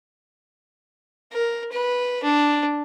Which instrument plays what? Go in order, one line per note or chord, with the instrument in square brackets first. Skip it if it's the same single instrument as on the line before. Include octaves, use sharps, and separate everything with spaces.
[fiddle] A#4
B4
D4